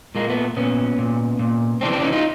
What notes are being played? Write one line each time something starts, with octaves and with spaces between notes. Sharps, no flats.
A#2 G#3 A#3
A3 B3
A#2 B3 C#4
A#2
A#2
C3 E3 C4 D4
C4 D4
C#4 D#4
D#4 F4